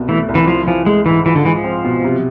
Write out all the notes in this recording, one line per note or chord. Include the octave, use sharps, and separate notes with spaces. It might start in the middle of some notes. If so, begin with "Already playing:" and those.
Already playing: C2 B2
E3 A3
C2
E3
F3 E4
E3 F3
G#3 A3
G#2 E3
E3 F4
D3
E3 G#3
F3
C4
B2
C3